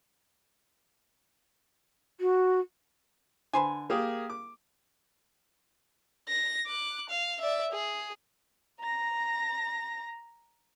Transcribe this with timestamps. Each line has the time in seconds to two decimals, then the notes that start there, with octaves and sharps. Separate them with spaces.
2.20 F#4
3.53 D3 B4 C5 G#5
3.90 A#3 G4 G#4
4.30 D6
6.29 A#6
6.67 D6 F#6
7.09 F5
7.41 D5 E5
7.72 G#4
8.80 A#5 A#6